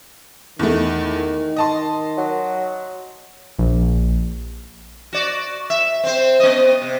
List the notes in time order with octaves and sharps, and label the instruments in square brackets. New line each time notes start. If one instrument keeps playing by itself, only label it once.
[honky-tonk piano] E2 A3 [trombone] D#3
[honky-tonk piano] D#5 A5 C6
[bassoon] F#3
[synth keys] A#1
[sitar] F#4 D5
E5
C4 C5
B3 D#5
C3